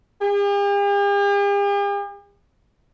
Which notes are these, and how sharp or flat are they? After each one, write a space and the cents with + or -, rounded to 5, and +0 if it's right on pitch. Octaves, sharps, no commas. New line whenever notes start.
G4 +45